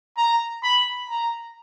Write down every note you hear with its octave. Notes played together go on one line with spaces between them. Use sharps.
A#5
B5
A#5